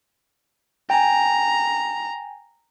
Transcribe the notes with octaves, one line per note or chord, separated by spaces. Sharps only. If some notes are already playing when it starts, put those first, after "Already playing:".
G5 G#5 A#5